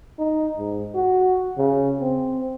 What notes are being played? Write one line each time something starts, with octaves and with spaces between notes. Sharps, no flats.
D#4
G#2
F#4
C#3
C4